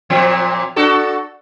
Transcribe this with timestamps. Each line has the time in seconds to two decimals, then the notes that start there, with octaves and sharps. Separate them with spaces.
0.10 A#2 F3 C4
0.76 D4 F#4 A4